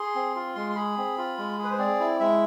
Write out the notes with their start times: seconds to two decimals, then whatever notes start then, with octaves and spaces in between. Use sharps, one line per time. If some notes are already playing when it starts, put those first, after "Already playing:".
Already playing: G#4 C6
0.15 C4
0.36 F4
0.55 G#3 C6
0.70 C6
0.76 G#4 B5
0.97 C4
1.18 F4
1.38 G#3
1.58 G#4
1.64 B4
1.71 C5
1.78 C4 D5
2.00 E4
2.20 G#3 E5